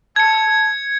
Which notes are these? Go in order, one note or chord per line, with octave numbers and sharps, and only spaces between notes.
A5 G#6 C#7